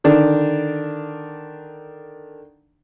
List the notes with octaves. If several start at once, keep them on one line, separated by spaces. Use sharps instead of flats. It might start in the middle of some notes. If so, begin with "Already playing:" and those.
D3 D#3 D4